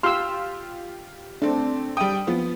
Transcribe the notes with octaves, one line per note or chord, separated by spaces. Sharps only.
F4 G4 C6 E6 F6
A3 C4 D4
G3 G5 D#6
F3 B3